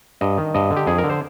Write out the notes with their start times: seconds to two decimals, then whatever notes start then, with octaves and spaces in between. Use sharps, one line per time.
0.21 G2 D#5
0.38 D#3
0.54 G2 D#5
0.71 D3
0.77 G4
0.87 F2 G#4
0.98 A#4
1.04 D3
1.10 C5